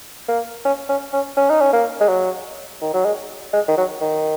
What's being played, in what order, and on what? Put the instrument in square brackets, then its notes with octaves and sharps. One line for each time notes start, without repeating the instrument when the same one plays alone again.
[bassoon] A#3
C#4
C#4
C#4
C#4
D#4
C#4
A#3
G#3
F#3
D#3
F#3
G#3
G#3
D#3
F#3
D#3